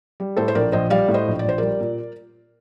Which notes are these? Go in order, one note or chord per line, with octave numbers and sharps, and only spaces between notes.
G3
A2 A4 C5
C5
A#1 A#4 D5
A#1 C5 D#5
G3 D5 F5
A2
C5 D#5
A#1
D5
A#1 C5
G3 A#4 D5
A#2